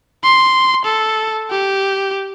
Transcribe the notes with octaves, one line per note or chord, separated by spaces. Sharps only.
C6
A4
G4